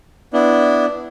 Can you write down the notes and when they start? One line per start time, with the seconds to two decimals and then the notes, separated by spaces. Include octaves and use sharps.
0.33 B3 D4 E4